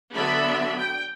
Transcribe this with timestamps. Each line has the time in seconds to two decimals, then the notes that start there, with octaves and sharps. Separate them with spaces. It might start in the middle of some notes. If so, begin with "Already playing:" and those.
0.13 D3 F#3 B3 D4 E5 B5
0.78 G5